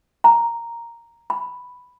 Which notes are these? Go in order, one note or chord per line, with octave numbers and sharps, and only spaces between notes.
A#5
B5